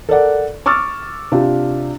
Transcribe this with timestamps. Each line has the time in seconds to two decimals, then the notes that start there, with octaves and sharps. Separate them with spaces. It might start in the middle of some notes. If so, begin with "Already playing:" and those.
0.09 A4 A#4 D5 F#5
0.66 C#6 D6 E6 F6 A6
1.32 C3 D4 F4 G4